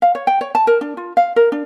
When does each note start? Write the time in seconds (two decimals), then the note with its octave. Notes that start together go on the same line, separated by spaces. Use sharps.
0.02 F5
0.15 C#5
0.27 G5
0.41 C#5
0.55 A5
0.67 A#4
0.81 D4
0.97 F4
1.17 F5
1.36 A#4
1.52 D4